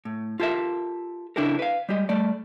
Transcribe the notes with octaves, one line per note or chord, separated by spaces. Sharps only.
A2
F4 G4 A4 A#4 E5
C#3 D4 E4 G4 A4 A#4
B4 F5
G3 G#3 G4 D#5
G3 A3 D5